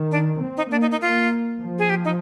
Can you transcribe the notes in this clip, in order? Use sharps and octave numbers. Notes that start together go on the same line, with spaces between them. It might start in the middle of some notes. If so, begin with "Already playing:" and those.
Already playing: D#3
D4
C4
D#4
A#3 D4
D#4
D#4
A#3 F4
F3
G#4
G4
D#4